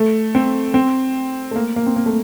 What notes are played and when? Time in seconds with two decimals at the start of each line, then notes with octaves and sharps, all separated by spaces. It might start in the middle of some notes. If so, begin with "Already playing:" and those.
Already playing: A3
0.35 C4
0.74 C4
1.51 A3
1.56 A#3
1.76 A#3
1.86 C4
1.96 A#3
2.06 A3